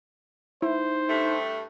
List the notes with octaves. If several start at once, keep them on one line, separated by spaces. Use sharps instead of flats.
D#4 E4 C5
G2 A3